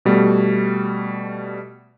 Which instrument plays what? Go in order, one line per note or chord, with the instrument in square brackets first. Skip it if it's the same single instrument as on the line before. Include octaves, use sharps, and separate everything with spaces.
[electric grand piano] B2 G3 A3